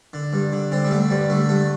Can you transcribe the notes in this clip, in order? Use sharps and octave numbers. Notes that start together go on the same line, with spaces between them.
D3
G2
D3
D3 C4
G3
D3 A3
G2 G3
D3 A3
G2 A3